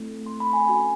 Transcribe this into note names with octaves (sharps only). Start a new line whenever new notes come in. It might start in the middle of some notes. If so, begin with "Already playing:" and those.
Already playing: A3 C4 E4 A4
C6
B5
G#5
C#4 F#4 A4 G#5